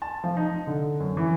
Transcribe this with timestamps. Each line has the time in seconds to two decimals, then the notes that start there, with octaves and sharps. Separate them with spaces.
0.02 A5
0.24 F3
0.37 D#4
0.67 D3
1.00 F#2
1.17 E3